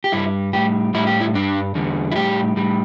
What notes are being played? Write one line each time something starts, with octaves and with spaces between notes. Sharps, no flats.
G4
G2 G3 E4
A2 G3 G4
A2 G3 E4
G4
E4
G2 G3 D4
E2 D3 G3
E4
A2 G3 G4
A2 G3